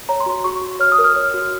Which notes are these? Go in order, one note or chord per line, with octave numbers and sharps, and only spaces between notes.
C#5 A#5
C6
F#4
F#4 C#6
F#4
C#5 F6
D#6
A#4
F6
C#5
F#4